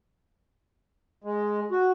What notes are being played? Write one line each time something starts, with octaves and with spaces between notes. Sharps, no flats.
G#3
F#4